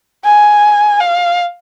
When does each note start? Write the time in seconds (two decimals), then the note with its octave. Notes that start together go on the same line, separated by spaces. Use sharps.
0.24 G#5
1.00 F5